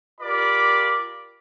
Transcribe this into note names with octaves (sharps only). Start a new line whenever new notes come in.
F4 G4 A#4 D5 B5 D6